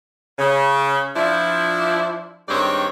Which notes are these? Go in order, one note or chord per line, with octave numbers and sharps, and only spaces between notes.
C#3
F3 D4 E4
G2 D#3 G#3 C4 C#5 D5